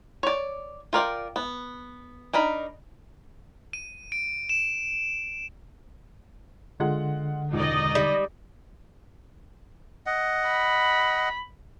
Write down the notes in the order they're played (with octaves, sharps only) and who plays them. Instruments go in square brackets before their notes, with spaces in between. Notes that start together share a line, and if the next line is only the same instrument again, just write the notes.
[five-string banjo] C#5 D5
F4 A#4 D5 G5
B3
D4 D#4 A#4 B5
[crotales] D#7
D7
E7
[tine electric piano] D3 [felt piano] G#3 F4 F#5
[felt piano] E1 C#2 [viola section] D#4 D5 D#5
[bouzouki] G3
[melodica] D#5 F#5
[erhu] B5